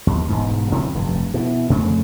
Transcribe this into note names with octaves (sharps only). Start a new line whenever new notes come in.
D#2
E1 G#2
D2 C3 E3 F#3
F1 G2
B2 E3
F2 C#3 A3 C4